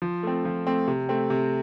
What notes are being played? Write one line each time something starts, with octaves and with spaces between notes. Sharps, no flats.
F3
A3 C4
F3
A3 C4
C3
A3 C4
C3